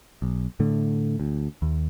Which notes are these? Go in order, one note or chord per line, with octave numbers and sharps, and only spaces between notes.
B1
A2 D3 A3
D2
D#2